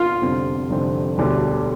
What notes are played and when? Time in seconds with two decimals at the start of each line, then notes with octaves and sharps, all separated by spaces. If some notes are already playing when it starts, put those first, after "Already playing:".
Already playing: F4
0.22 F1 F2 D3 G3 C4
0.70 F1 F2 D3 G3 C4
1.18 E1 D2 D3 G3 D4